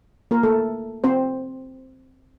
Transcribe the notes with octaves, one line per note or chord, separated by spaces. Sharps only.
A#3 A#4
A3 A4
C4 C5